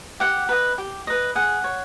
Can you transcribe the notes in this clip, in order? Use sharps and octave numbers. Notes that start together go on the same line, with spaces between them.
G4 F#5
B4 D#5
G4
B4 D#5
G#4 F#5
C#5